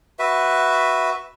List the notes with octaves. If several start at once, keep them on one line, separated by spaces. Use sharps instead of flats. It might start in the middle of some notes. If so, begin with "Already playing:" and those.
F#4 B4 E5